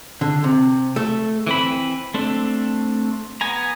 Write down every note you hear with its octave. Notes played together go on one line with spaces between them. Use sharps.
D3
C3
A3
E3 C4 B5
A3 C4 D4 A4
B3 G#5 A#5